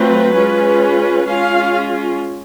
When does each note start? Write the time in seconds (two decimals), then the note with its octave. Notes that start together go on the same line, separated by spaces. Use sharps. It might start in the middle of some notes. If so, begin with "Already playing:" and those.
Already playing: F#3 A3 C4 F4 B4
0.35 G#3 C#4 F4
1.27 G#3 C#4 F4 F5